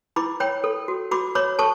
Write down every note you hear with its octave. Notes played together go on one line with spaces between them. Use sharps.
E4 B5 D6
C#5 G5 B5
A4
F#4
F#4 B5 D6
C#5 B5 D6
A4 A5 C#6